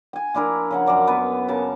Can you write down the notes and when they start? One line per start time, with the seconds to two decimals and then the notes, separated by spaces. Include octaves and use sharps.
0.13 G5 G#5
0.34 F3 D4 E4 A#4
0.71 C#3 F3 F#5
0.86 F#2 G#4 D5 A#5
1.07 B3 B4
1.48 C#3 A#4 A5